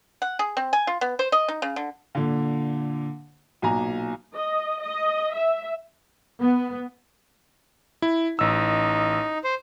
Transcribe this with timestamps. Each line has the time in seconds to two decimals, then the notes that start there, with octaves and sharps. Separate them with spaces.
0.22 F#5
0.39 G#4
0.57 C4
0.73 G#5
0.87 F4
1.01 B3
1.19 C5
1.32 D#5
1.48 D#4
1.62 C#3
1.76 D3
2.15 A#2 D3
3.62 B1 A#2 G#5 A#5
4.34 D#5
4.81 D#5
5.34 E5
6.40 B3
8.02 E4
8.39 A1 D#4 E6
9.44 C5